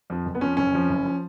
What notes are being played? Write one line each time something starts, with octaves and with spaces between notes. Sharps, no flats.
F2 F3
F#1
B3
F2 F3 C#4
F#1 C#4
F2 F3
F#1
F3